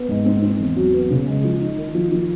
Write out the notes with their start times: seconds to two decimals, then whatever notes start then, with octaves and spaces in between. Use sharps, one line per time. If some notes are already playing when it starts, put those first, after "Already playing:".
Already playing: B3
0.08 G#2
0.26 C4
0.42 C4
0.59 E2
0.76 F#3
0.94 B3
1.10 C#3
1.27 G#3
1.44 F3
1.61 D#4
1.78 D#3
1.95 F3
2.12 F3